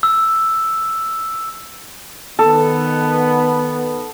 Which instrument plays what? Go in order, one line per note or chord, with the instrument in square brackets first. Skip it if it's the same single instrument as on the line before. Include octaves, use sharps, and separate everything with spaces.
[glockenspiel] E6
[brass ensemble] D#3 B3 [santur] A4